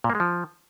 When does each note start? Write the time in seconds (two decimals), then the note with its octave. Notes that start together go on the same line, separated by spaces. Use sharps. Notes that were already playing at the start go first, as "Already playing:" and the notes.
0.04 A#2
0.10 A#3
0.15 G#3
0.20 F3